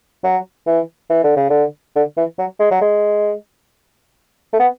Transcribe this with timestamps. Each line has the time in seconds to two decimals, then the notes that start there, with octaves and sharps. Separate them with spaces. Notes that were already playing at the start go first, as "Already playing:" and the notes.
0.24 F#3
0.67 E3
1.10 E3
1.24 D3
1.36 C#3
1.50 D3
1.96 D3
2.17 E3
2.38 F#3
2.59 G#3
2.71 F#3
2.81 G#3
4.53 A3
4.59 B3